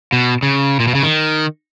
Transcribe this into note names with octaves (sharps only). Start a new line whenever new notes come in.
B2
C#3
A#2
B2
C#3
D#3